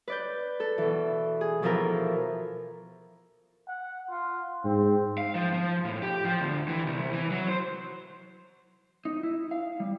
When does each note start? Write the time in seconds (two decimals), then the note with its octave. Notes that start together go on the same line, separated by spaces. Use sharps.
0.08 B4 D5 G6
0.60 A4
0.78 B2 E3
1.41 G#4
1.62 B2 E3 F3 E4 A4 A#4
3.67 F#5
4.10 F4
4.64 G#2 C4
5.18 F5
5.35 F3
5.53 F3
5.85 A2
6.03 G4
6.25 F3
6.41 D2
6.68 E3
6.86 C2
7.13 E3
7.31 F#3
7.48 C5
9.05 D#4
9.23 E4
9.51 F5
9.80 G3